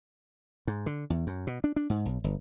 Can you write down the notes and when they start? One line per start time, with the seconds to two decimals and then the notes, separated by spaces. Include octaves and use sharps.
0.67 G#2
0.86 D3
1.10 E2
1.27 F#2
1.47 B2
1.64 D4
1.76 D4
1.90 G#2
2.06 B1
2.24 G1